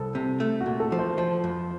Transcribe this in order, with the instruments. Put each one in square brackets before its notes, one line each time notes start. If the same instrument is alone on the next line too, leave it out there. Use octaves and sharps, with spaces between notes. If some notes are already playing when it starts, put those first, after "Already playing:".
Already playing: [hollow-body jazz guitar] C2 [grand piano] A4
[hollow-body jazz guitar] C3
A3
[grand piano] F#4
[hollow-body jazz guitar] A#2
[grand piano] A4
[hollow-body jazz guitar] F3
[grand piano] C5
[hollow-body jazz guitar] F3 [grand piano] C5
[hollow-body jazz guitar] F2